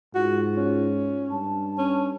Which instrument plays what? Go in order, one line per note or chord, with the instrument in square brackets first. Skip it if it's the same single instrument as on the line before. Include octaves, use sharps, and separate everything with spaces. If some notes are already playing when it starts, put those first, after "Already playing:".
[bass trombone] G#2 [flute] F4 [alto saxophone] F#4
[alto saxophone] C#4
[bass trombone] G2 [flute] A5
[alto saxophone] C#4